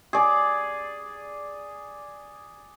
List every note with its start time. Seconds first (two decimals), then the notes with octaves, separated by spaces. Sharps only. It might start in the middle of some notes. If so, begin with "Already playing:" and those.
0.13 G#4 D5